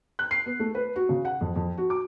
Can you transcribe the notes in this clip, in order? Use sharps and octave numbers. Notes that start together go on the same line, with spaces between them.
F#6
C7
B3
A3
B4
F#4
C#3
F#5
F2
F2
F#4
D6